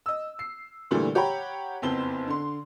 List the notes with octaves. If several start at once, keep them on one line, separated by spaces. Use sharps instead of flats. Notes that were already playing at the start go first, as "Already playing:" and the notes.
D#5 E6
C7
A#2 D3 E3 G3 A3
G4 C#5 F#5 G5 A#5 B5
F#1 F2 B3 C4 A5 G7
D3 C6